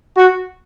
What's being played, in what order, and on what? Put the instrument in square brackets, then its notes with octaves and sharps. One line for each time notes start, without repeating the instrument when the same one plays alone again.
[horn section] F#4